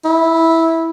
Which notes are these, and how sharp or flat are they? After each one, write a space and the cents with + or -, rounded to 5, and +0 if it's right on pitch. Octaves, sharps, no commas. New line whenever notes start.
E4 -10